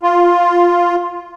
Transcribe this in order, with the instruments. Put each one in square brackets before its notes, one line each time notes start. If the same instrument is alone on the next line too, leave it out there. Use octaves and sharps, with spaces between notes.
[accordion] F4